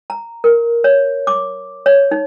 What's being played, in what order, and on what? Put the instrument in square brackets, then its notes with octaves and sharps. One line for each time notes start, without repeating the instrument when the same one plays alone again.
[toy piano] A#5
A#4
C#5
D6
C#5
D#4